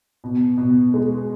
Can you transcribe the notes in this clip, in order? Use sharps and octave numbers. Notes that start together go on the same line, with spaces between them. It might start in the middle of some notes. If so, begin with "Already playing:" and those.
B2
B2
G#3